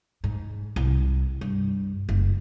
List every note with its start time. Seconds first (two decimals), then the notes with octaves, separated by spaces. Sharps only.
0.24 G#2
0.76 C2
1.41 G2
2.09 F#1